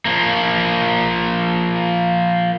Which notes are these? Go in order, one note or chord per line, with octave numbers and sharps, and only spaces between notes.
F3 A#3